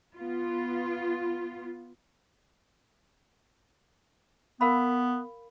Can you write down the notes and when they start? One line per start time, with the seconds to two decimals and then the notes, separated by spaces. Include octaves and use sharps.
0.16 B3 F4
4.61 B3 A#4 F5 B5